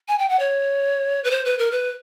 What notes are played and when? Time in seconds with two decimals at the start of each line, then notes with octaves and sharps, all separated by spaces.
0.08 G#5
0.19 G5
0.29 F#5
0.39 C#5
1.24 B4
1.31 C5
1.45 B4
1.59 A#4
1.71 B4